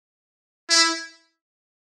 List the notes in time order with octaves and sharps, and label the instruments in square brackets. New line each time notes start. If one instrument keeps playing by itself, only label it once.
[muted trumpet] E4